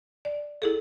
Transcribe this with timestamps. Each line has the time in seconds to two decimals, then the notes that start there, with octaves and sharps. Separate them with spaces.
0.25 D5
0.62 E4 G#4 A4